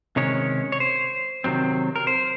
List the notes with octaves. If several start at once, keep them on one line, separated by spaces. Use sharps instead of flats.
C3 D#3 G#3 C#4 C#5
C#5
C5
C3 D#3 F#3 C4
A#4
C5